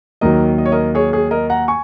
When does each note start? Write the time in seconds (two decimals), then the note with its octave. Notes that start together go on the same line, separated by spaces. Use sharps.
0.21 D#2 D#3 F#3 A#4 D#5
0.58 D#5
0.65 C#5
0.72 A#4 D#5
0.95 G#4 C#5
1.13 G#4 C#5
1.31 A#4 D#5
1.50 F#5 A#5
1.68 G#5 C#6